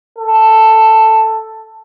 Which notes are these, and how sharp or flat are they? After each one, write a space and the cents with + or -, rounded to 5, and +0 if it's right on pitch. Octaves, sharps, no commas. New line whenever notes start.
A4 +5